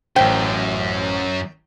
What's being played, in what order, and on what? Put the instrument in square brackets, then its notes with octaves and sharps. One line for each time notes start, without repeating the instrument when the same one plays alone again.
[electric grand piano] A1 C5 [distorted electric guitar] F#2 [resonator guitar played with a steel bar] G5